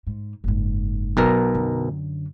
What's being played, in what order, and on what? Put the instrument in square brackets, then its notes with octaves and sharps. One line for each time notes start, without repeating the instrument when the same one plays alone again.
[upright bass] G#2
F#1 G#2
[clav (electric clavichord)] B1 B2 A#4
[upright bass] F#2 D3